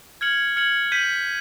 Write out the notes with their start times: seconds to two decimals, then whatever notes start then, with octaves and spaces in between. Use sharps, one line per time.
0.21 F6 G#6 C#7 F#7
0.56 F6 G#6 C#7 F#7
0.92 G6 B6 D#7 F#7